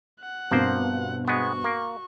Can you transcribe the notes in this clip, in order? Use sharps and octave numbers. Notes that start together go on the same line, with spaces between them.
F#5
G2 B2 F3 A#3 C4 C5
G#3 B3 F#4 C#6
A#3